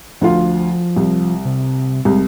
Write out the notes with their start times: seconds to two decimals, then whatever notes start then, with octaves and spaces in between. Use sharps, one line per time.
0.21 D2 F3 F4
0.96 C2
1.45 C3
2.05 C2 G#3